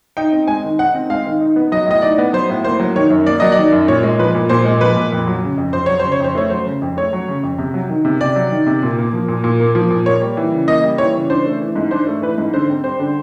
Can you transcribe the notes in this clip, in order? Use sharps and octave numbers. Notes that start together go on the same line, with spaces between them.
D#4 G5
C4
G#3 G#5
D#3
D#4 F#5
C4
G#3 F5
D#3
D#4
B3
F#3 D#5
A2 D#5
D#4 D5
B3
F#3 C5
A2
A#3 C5
F#3
D#3 C#5
F#2
A#3 D5
F#3 D#5
D#3 D5
F#2
A#2 C#5
G#3
F3 B4
A#2
A#2 C5
G#3
F3 B4
A#2
F2
F#3
C#3
F2
F2 C5
F#3 C#5
C#3 C5
C#5
F2 C5
A3 C#5
F#3 C5
C#3
F2
A3 C#5
F#3
C#3
F2
C3
F#3
D#3
C3
C3 D5
F#3
D#3
C3
A#2
A#3
F3
A#2
A#2
A#3
F3
A#2
A#3 C#5
G3
E3
C#3
A#3 D#5
G3
E3 C#5
C#3
D4 C5
A3
E3
G#2
D4 C5
A3
E3 B4
G#2
D3 C5
C4
G3 C5
D3